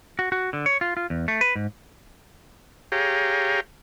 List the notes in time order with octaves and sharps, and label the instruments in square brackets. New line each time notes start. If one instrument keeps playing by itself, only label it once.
[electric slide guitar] F#4
F#4
D3
C#5
F4
F4
E2
A3
B4
G#2
[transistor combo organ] G4 G#4 C#5 F5 G5 A#5